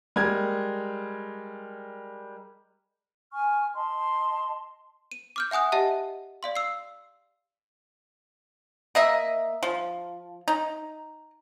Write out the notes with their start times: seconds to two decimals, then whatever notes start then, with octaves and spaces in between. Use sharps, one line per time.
0.16 G3 G#3 A#4 G#6
3.32 G#5 C#6 F6
3.74 D#5 A5 C6
5.11 D#7
5.36 D6 F6 G6
5.51 E5 F#5 G#5 D#6 F#6
5.72 G4 D#5 E5 F#5 A5
6.43 D5 F5 C6
6.56 E6 C7
8.95 A#3 D#5 E5
9.63 F3
10.48 D#4